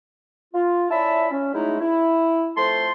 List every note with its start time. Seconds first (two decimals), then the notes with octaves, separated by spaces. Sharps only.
0.54 F4
0.91 C#4 E4 D5 E5 A5 B5
1.31 C#4
1.53 F#3 G#3 A3 D#4 E4
1.80 E4
2.57 F2 A3 C5 A5 C6